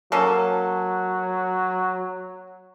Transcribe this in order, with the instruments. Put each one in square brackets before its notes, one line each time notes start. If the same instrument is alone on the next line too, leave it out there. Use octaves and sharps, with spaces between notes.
[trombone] F#3 [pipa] A#3 C#4 A4